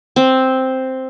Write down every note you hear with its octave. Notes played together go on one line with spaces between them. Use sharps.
C4